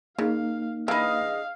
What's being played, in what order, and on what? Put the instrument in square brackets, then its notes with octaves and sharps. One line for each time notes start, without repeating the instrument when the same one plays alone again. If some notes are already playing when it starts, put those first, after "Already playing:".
[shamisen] C#3 [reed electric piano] A#3 D#4 [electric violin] F5
[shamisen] E3 B4 [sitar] D4 G#4 D#5 [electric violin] F5